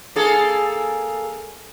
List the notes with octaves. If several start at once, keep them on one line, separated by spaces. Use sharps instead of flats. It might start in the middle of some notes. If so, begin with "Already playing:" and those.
A#3 G#4 A4